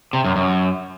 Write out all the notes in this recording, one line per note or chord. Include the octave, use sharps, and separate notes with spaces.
C3
F#2
F#2